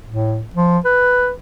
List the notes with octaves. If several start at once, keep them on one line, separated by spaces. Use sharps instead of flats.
A2
F3
B4